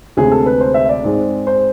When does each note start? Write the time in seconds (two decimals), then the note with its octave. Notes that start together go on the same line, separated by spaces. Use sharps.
0.17 D2 C3 G#3 G#4
0.32 A4
0.46 B4
0.61 C5
0.74 E5
0.89 D5
1.03 G#2 G#3 C4
1.47 C5